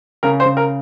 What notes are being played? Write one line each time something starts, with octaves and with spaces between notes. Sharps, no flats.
C#3 A#4
C5
C#3
A#4